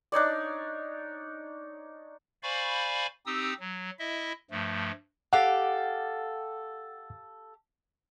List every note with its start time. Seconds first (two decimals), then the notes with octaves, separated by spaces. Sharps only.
0.12 D4 D#4 C#5 D5
2.43 C5 D5 F5 G#5 B5 C#6
3.26 C4 D#4 G4 D#6 E6
3.60 F#3
3.99 E4 D#5 E5
4.51 G2 F3 A3
5.33 G4 A4 F5 F#5